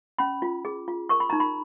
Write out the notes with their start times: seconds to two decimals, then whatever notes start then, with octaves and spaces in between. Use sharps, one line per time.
0.19 C#4 B5
0.42 F4
0.65 G#4
0.88 F4
1.09 A#4 C#6
1.20 B5
1.30 D#4 A#5
1.40 B5